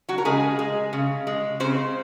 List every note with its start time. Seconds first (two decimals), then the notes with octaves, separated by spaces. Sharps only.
0.09 F#3 F#4
0.18 A#4
0.25 C#3 G#3 G#4
0.59 G#3
0.93 C#3
1.27 G#3
1.60 C#3 C4 C5